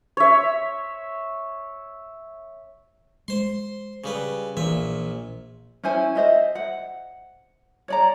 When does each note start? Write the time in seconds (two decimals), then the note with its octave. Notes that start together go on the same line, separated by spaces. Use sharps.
0.17 C#5 E5
3.28 G#3 C5 C6
4.04 C#3 G3 B4
4.57 A#1 A#2 E3 E5
5.83 C#4 E4 C5 G#5
6.15 C5 D#5 E5
6.55 F#5
7.88 C#5 D5 A#5